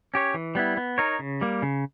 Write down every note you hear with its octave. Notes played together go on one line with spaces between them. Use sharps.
C#4 G4 C#5
E3
G3 B3 E4
B3
D#4 A#4 C#5
C#3
G3 A#3
C#3